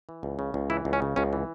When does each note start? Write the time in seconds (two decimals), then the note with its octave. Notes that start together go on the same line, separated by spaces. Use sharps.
0.09 E3
0.23 C#2
0.39 C#3
0.54 C#2
0.70 E3 E4
0.85 C#2
0.93 C#4
1.02 C#3
1.16 C#2 C#4
1.33 E3